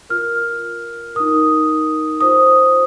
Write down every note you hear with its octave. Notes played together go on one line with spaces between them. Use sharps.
F4 A#4 F6
D#4 A#4 D#6
F4 C5 D#6